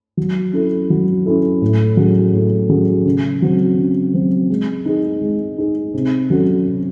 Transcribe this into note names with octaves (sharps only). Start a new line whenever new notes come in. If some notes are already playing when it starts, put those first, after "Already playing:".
F#3
C#4 E4 A4
F#3
C#4 E4 A4
A2
F#3 C#4 G#4
A2
F#3 C#4 G#4
C#3
F#3 C4
C#3
F#3 C4
G#3
D#4 G#4
G#3
D#4 G#4
C3
F#3 C#4 F#4 A4
C3